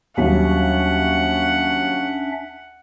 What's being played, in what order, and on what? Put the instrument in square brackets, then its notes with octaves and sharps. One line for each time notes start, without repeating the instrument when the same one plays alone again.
[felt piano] D#2 F#3 G3 [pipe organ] C#4 D4 E5 [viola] F#5